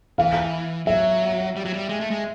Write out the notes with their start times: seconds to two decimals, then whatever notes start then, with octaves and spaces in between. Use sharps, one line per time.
0.18 E3 F5
0.86 F#3 E5
1.56 G3
1.65 F#3
1.74 G3
1.89 G#3
2.00 A3
2.10 G#3